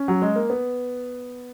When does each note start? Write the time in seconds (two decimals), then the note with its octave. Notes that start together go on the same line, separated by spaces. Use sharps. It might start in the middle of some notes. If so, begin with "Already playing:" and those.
Already playing: C#4
0.08 F#3
0.22 G#3
0.36 A#3
0.50 B3